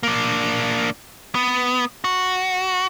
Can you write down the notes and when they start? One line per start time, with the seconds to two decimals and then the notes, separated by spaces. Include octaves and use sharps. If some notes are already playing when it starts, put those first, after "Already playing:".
0.03 A#3 D4
1.35 B3
2.04 F#4